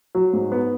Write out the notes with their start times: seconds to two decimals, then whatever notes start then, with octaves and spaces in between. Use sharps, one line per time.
0.15 F#3
0.33 G#2
0.52 B3